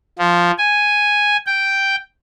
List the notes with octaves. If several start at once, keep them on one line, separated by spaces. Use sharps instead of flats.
F3
G#5
G5